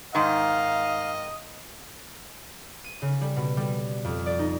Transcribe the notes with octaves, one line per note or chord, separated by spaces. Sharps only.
G#2 D#3 D#5 F5
D#7
C#3
G3
B2
G3
F2
D5
D#4